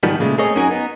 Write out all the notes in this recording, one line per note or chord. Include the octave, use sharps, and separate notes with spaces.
G#2 B2 D#3 F3 G3 B3
A#2 C#3 G#3 A3
A3 C4 G#4 A#4 C#5 D#5
F#2 C#4 D#4 F#4 A#4 G#5
B3 D#4